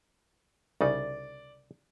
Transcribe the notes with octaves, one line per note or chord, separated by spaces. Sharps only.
C2 C#3 D#4 D5